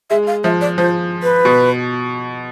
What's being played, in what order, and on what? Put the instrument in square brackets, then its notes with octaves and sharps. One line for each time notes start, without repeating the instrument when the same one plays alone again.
[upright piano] G#3 [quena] E5
[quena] F5
[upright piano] F3 [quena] E5
[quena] D5
[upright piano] F3 [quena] C5
[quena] B4
[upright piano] B2